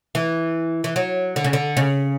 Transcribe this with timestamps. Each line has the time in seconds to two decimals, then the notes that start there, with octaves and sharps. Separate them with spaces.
0.15 E3
0.84 E3
0.96 F#3
1.36 D3
1.44 C#3
1.53 D3
1.77 C#3